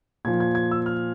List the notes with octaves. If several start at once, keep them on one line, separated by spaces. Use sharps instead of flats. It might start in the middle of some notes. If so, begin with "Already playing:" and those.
A#2 F3 G#6
G#6
G#6
E6
F6